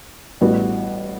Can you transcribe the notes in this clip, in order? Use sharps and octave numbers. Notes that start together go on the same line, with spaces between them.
A1 A2 G3 B3 F#4